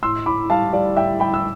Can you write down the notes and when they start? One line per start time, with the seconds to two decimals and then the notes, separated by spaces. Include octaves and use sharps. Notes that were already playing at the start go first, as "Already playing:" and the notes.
0.03 A2 C6 E6
0.26 A2 B5 D6
0.50 G3 F5 A5
0.73 G3 D5 F5
0.97 A2 E5 G5
1.20 G3 G5 B5
1.34 E6